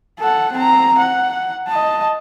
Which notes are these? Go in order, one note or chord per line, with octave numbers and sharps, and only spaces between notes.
A4 F#5
C4 A#5
F#5
D#5 A5